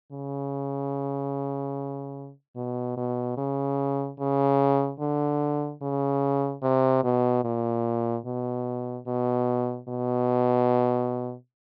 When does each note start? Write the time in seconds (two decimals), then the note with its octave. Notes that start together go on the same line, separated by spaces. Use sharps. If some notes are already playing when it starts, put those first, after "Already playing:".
0.12 C#3
2.56 B2
2.97 B2
3.38 C#3
4.19 C#3
5.00 D3
5.82 C#3
6.63 C3
7.04 B2
7.44 A#2
8.25 B2
9.07 B2
9.88 B2